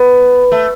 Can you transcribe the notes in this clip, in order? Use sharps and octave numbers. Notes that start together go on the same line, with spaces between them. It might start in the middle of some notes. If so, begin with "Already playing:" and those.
Already playing: B3
A3